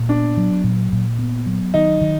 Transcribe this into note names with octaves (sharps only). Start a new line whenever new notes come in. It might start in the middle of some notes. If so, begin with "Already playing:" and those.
Already playing: A#2
B3 D4
F#3
A#2
A#2
B3
F#3
D#3 D#4
D#3